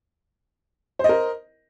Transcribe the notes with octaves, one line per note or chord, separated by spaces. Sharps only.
A#4 C5 D#5